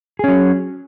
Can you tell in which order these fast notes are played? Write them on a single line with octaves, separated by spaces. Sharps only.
G#4 C#4 F#3